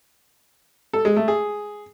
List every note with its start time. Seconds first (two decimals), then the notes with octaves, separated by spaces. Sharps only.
0.93 A4
1.05 G#3
1.16 A3
1.28 G#4